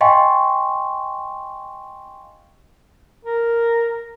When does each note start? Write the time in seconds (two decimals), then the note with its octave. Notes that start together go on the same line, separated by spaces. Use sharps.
0.01 D#5 F5 G5 G#5 C6 C#6
3.25 A#4